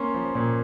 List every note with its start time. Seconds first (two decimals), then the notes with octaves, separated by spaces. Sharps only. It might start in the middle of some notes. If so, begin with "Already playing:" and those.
Already playing: A#3 C#4 C6
0.14 F3
0.35 A#2